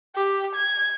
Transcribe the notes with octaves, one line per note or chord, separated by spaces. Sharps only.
G4
G#6